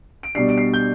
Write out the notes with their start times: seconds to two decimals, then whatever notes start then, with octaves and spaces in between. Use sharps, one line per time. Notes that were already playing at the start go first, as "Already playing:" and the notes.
0.23 D7
0.35 B2 G3 D4 C7
0.49 D7
0.58 C7
0.74 G6